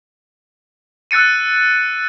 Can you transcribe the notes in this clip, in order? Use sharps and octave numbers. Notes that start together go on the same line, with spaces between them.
E6 F#6 A6 C#7 D#7